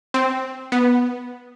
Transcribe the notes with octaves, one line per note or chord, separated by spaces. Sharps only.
C4
B3